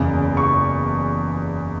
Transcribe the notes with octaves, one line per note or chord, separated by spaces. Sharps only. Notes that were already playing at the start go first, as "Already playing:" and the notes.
Already playing: F#1 E2 C#3
C#6